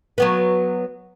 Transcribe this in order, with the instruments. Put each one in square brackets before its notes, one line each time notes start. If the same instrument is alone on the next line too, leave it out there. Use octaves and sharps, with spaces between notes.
[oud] F#3 B3 B4